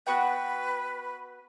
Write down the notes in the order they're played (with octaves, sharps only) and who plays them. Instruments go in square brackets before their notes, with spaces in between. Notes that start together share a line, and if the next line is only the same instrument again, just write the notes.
[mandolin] B3 F#4 G5 [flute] B4